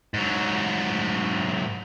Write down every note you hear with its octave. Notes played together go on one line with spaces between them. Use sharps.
G#2 F#3